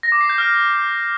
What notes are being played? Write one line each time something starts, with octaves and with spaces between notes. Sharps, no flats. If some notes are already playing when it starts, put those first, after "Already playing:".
A#6
D6
C7
G6
F6